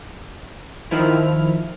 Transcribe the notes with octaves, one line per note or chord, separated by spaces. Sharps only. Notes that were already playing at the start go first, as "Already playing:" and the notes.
D#3 F3 E4 F6